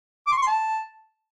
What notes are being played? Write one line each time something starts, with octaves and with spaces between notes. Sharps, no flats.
D6
C6
C#6
C6
A5